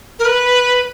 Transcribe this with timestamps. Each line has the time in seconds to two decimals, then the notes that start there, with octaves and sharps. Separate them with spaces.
0.19 A#4
0.25 B4